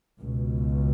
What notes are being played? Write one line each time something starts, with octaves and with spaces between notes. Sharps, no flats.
C#2 B2